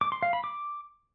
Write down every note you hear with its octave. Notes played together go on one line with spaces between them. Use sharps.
D6
C6
F5
B5
D6